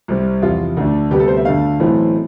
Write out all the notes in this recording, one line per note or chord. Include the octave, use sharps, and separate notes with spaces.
C2 C3 G3 C4
E2 C3 F3 F4
D2 D3 A3 D4
D2 C3 G3 B3 G4
A4
C5
E5
D2 D3 A3 F5
B1 A2 E3 A3 C4